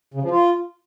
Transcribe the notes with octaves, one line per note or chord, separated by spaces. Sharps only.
C#3
F3
F4